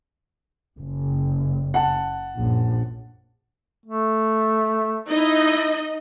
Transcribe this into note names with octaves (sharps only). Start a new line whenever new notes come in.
F#1
F#5 A5
A#1 F#2
A3
D#4 E4 D#5